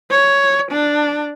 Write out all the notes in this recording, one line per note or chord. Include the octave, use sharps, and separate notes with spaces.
C#5
D4